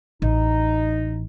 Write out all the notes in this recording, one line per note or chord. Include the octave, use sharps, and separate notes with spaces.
A1 D#4